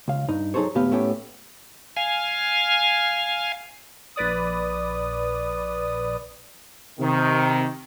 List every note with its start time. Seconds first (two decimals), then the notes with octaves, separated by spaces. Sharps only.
0.08 C#2 F5
0.29 G2 D#4
0.54 F#3 D#4 G#4 A4 C5 C#5
0.75 D#2 A#2 A3 B3 G4 F5
0.91 A2 A3 B3 C#4 G4
1.96 F5 G#5
4.16 A#1 B4 D5 D#6
6.99 C3 D#3